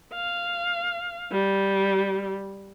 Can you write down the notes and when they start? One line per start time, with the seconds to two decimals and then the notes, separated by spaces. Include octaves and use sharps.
0.14 F5
1.32 G3